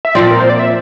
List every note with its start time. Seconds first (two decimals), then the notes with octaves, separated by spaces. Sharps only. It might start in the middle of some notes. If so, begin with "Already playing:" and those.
0.05 E5
0.15 A#2 F3 C4 D5
0.31 A#4
0.40 C5
0.49 D5
0.59 E5